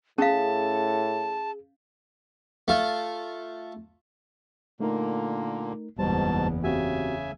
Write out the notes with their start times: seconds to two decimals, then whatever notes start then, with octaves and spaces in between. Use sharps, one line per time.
0.18 A2 C#4 G#4 F5 A5
2.68 A3 F4
4.80 A#2 D3 A3 A#3 D#4 A#4
5.99 F#1 E2 G#2 B2 G3 C5 A5
6.64 C#3 C4 F#4 G4 E5 G#5